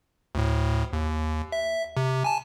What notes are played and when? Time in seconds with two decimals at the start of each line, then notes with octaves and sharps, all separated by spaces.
0.35 D2 A2
0.93 D#2
1.52 E5
1.97 C3
2.24 G#5 A5